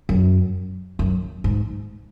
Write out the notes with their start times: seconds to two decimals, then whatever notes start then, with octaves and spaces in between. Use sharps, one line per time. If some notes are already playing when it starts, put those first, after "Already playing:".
0.09 F#2
0.99 F#2
1.44 G#2